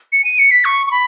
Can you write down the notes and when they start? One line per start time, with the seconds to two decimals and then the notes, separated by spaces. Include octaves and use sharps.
0.12 C#7
0.24 D#7
0.39 C#7
0.51 B6
0.65 C#6
0.87 C#6
0.91 B5